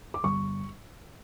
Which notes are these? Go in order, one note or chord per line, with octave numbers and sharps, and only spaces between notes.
D6
G1 C#6